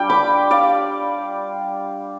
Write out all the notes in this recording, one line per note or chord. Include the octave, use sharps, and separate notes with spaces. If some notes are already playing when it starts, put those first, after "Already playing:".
Already playing: G3 D4 F4 G5
B5 D6
D5 F5